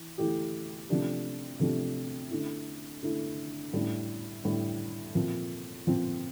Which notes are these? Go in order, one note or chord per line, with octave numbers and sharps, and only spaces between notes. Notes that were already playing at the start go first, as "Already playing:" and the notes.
Already playing: E3
E3 A3 E4 G4
C3 F3 A3 D4 G4
C3 F3 A3 D4 G4
D3 A3 E4
D3 A3 E4
A2 G3 D4
A2 G3 D4
A#2 F3 C4
A#2 F3 C4